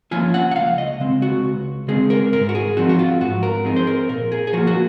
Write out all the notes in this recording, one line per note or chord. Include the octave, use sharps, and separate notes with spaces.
F3 A#3 C#4 F4 G#5
F#5
F#5
C#2 F5
D#5
C#3 G#3 C4
F#4
C#2
C#3 G#3 C4 G#4
A#4
G#2 A#4
F#4
G#4
F3 C4 D#4 F#4
F#4
F4
G#2 F#4
A#4
F3 C4 D#4 G#4
C5
A#4
A#2 A#4
G#4
G#4
F3 A#3 F#4
F#4